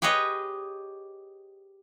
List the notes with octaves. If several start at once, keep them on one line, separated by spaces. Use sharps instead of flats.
G4 G#4 B4 C#5 D#5